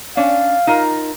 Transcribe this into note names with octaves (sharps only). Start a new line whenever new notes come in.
C#4 D4 F5
D#4 F4 A#4